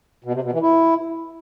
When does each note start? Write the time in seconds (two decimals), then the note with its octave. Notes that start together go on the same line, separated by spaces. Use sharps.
0.24 B2
0.34 C3
0.43 B2
0.53 E3
0.62 E4